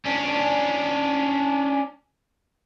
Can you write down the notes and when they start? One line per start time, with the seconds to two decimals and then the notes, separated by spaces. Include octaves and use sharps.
0.05 C#4 D4